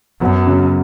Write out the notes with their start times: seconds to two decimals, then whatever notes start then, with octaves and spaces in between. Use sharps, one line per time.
0.20 F#2 F#3 B3
0.47 C#3 F#3